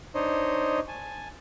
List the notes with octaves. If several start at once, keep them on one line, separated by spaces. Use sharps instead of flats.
D4 D#4 C5 C#5 D#5
G#5 A5